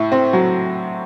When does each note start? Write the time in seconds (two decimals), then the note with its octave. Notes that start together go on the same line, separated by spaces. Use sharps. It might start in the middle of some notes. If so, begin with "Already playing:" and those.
Already playing: A2 E4
0.12 C4
0.33 F#3